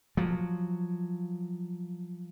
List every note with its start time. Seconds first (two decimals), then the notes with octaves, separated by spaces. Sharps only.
0.17 F3 F#3